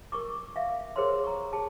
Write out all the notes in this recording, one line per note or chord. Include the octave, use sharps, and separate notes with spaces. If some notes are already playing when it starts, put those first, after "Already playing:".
A#4 C#6 D6
E5 F5
G#4 A#4 C5 C#5 C6
A#5 C#6
G#4 A5